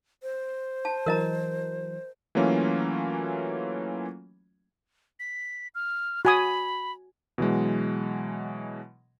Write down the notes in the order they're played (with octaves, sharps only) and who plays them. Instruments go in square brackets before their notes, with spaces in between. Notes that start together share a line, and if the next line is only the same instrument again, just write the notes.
[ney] C5
[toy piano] A5
[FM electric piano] E3 F#3 [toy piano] A#4 D#5 A#5
[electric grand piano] E3 F#3 A3 A#3 C#4 F4
[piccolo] B6
F6
[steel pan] F#4 G#5 D#6 [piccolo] B5
[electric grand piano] B2 E3 F#3 G#3